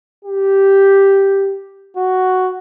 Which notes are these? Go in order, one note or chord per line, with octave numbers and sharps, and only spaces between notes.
G4
F#4